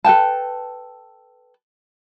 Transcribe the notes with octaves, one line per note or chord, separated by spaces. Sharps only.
A4 B4 G5 A5